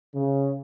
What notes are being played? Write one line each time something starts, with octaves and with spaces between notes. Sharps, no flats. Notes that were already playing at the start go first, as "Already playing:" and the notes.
C#3